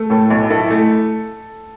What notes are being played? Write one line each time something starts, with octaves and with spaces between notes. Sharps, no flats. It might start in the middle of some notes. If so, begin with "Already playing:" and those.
Already playing: A3
A2 A4
B1
E4 A4
A3